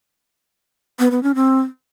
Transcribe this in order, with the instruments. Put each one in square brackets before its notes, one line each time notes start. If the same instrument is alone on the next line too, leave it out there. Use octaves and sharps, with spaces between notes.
[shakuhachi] B3
B3
C#4
C4